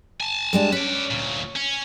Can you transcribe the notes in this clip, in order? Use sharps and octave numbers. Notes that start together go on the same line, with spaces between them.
G#5 A5
G3 G#3 D4
C#4 B4 D5
D2 A#2
C#4